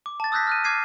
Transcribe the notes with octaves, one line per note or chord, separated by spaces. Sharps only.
D6
A5 A6
D#6 E6 F#6 G6 A#6 B6
F6 F#6 D#7
D6 F6 G#6 C7 D#7